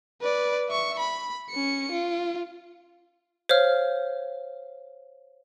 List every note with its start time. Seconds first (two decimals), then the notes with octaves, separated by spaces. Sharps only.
0.21 B4 D5
0.69 E5 C#6
0.99 B5
1.50 C#4 C#7
1.92 F4
3.49 C5 C#5 F5 F6